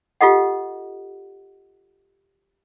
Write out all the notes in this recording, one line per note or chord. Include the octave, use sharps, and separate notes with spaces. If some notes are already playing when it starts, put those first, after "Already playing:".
F4 G4 A4 D#5 F#5